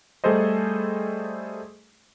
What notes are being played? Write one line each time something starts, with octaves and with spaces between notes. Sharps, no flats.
G3 A3 G#4 A4 C5 D#5